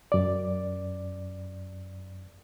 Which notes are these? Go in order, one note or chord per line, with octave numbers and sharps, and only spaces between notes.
F#2 D5